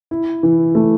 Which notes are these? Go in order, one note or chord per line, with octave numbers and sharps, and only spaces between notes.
E4
E3
A3